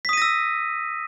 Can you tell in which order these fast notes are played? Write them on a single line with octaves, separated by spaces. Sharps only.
B6 D#6 D#7 A#6 E6